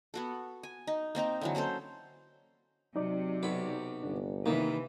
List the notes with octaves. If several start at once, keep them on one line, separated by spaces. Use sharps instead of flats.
B3 F#4 A4
G#5
D#4
A#3 C4 D#4 A#5
D3 E3 F#3
A#3 C#4 A4 C5
C3 F#3 D#4 D5
B1 B5
G1 D4
C3 D#3 E3 A#3 D#4